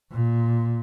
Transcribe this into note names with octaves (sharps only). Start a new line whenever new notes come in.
A#2